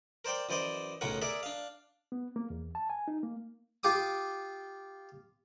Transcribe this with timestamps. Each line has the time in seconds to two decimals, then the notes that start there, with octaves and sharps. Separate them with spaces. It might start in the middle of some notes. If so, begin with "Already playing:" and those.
0.25 A#4 C5 D5 G5
0.49 F#2 E3 C5 D5 D#5
1.01 B1 A2 C#3 C#4 A#4 F#5
1.22 G#4 A#4 D5 E5
1.43 D4 F5
2.12 B3
2.36 A#3
2.50 E2
2.75 A5
2.90 G#5
3.08 D#4
3.23 A#3
3.83 F4 G4 D6 D#6